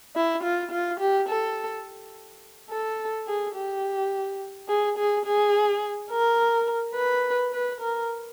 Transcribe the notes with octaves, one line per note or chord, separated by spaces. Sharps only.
E4
F4
F4
G4
A4
A4
G#4
G4
G#4
G#4
G#4
A#4
B4
B4
A#4